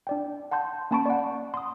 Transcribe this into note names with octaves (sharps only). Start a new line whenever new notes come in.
D4 D5 G5
F#5 A5 C6 G6
A#3 C#4 A5 B5 C#6 D7
D5 F#5
C6 D#6